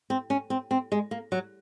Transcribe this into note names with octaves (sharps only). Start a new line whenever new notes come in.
C4
C#4
C4
C4
G#3
A#3
F#3